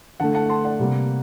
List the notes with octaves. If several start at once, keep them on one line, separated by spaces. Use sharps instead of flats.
D3 A3 F#5 A5
F#5 A5
A5 C6
D5 F#5
C3 G3 A#3